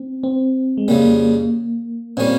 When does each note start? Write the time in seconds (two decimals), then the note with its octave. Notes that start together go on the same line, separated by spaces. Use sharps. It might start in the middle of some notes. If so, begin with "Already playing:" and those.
Already playing: C4
0.23 C4
0.78 G#3
0.88 F2 C#3 G3 A#3
2.17 A#2 G3 C4 C#4